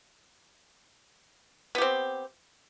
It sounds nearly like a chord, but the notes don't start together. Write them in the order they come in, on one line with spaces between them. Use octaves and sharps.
B3 G4 C4